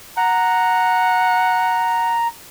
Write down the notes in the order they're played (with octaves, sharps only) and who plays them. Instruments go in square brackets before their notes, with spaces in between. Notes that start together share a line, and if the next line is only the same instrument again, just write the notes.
[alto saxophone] F#5 [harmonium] A#5